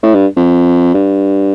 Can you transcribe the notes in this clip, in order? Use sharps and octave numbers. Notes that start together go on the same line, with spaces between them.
A2
G2
F2
G2